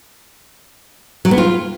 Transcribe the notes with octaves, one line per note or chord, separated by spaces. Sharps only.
F#3
B3
F4